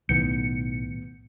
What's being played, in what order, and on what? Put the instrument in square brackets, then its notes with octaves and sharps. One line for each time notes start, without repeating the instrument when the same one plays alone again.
[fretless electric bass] B1 D#3 [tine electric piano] A2 B3 G6 [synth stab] C#7